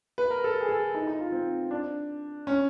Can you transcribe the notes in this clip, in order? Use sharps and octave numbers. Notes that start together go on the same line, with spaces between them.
B4
A#4
A4
G#4
A4
D#4
D#4
F4
C4
D4
C#4